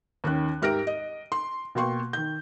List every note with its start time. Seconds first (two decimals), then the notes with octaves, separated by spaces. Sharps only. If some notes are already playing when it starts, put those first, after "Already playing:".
0.24 D#2 D#3 C#4 F#6
0.62 G#2 G4 A#4 E5 A#6 D7
0.87 D#5
1.32 C6
1.75 B2 A#3 G5 C6 C#6
2.13 D#3 G6